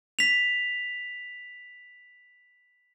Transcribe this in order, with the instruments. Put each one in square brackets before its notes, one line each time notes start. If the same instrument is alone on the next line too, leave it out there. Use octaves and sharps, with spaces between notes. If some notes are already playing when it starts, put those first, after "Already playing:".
[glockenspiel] B6 F7